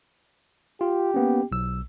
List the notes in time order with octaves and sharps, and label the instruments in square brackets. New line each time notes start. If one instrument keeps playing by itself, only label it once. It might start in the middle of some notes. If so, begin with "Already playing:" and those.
[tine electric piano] F4 [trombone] G4
[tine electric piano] A#3 B3 C#4
B1 E6